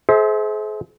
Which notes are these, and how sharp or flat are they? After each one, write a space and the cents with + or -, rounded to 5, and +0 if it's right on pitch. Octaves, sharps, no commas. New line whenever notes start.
G#4 +40 C5 +0 E5 -30